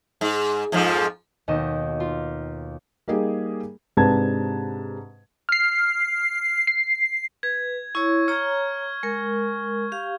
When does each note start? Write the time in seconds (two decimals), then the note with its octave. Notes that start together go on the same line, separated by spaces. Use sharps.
0.21 G#2
0.72 F2 G#2 F3
1.48 D#2 B2 F#4 D#5 G5 E7
2.00 F4
3.08 G3 A#3 D#4 G4 G#4
3.97 G#2 C3 D4 B4 A5 G#6
5.49 F6 C7
6.67 C7
7.43 B4 G#6
7.95 E4 C#5 C#6
8.28 C#5 A#5 F6 G#6
9.03 G#3 A#4
9.92 G4 F5